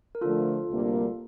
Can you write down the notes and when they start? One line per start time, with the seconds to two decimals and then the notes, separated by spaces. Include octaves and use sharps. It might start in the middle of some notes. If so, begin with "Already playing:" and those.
0.15 A#4
0.21 D3 F3 A3 F4 A4
0.69 D2 C3 G3 A#3 D4